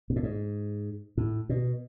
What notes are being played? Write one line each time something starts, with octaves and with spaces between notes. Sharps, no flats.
B2
A2
G#2
A2
B2